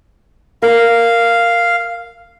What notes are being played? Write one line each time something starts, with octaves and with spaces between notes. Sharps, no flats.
A#4 F5